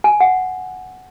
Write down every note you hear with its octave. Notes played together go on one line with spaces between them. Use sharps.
G#5
F#5